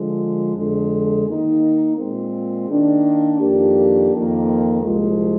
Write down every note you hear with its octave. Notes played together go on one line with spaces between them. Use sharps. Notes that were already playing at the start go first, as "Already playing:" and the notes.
Already playing: D3 F3 G#3
F2 D3 G#3
D#3 A#3 D#4
A#2 G#3 C4
D#3 A#3 D4
F2 D#3 A#3 D4 G4
F2 D#3 A#3
C2 A#2 F3 G#3